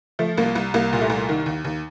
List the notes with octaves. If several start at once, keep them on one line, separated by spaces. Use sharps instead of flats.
F3 A3
C2 A#3
C2
C2 A#3
A#2
A3
C2
D#3
D#2
D#2